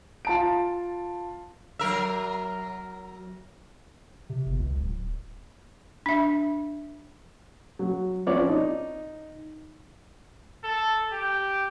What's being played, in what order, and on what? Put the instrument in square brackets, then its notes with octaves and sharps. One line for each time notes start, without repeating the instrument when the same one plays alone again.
[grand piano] F4 A5 D7
[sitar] F#3 A#4 E5
[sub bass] C3
G1
C#2
D1
[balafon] D4 E5
[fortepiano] F#3
F3 C4 C#4 C#5 D5
D#4
[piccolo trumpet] A4
G4